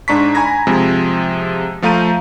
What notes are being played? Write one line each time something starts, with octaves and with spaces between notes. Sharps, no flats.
G#2 D4 A#5 C#6 B6
G#5 A#5 B5 G#6 A#6
C3 F3 G#3
F3 A3 F5 A#5 G6 D#7